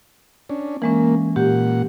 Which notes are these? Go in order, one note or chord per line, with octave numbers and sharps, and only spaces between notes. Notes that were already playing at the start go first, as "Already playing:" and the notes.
C#4 D4
E3 G#3 A#3 C#4
A#2 G4 F#5